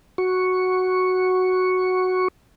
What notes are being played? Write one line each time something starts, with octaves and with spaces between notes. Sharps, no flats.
F#4 C#6